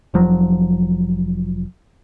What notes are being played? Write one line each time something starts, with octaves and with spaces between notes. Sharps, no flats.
F1 F3 F#3